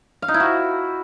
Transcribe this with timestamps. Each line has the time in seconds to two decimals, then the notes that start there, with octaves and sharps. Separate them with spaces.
0.22 F5
0.28 D#4
0.34 E4
0.40 F#4